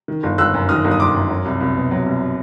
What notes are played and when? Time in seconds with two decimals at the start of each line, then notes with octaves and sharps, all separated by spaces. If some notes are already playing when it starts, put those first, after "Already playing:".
0.08 D#3
0.23 G1
0.38 G1 E6 F#6
0.54 F#2
0.69 D#3 D#6 F6
0.85 G1
0.91 D#6
1.00 G1 C6 D6
1.15 F#2
1.30 F#3
1.45 C2
1.61 C2
1.76 B2
1.91 F#3
2.06 C2